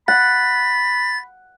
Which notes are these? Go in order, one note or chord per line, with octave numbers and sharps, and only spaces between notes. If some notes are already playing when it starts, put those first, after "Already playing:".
F#5 B5 A6